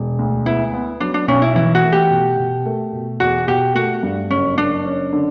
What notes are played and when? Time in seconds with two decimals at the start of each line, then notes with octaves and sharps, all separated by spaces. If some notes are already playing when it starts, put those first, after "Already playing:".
Already playing: E1
0.19 D2
0.46 B3 E4
0.74 B3
1.00 F#3 D4
1.14 D4
1.28 B1 C#4
1.42 E4
1.55 E3 E4
1.75 F#4
1.83 A3
1.92 G4
2.11 B2
2.37 B2
2.66 A3
2.93 B2
3.20 E2 F#4
3.48 B2 G4
3.75 A3 F#4
4.03 G2
4.30 F#1 C#4
4.58 F#1 D4
4.85 C#4
5.13 D3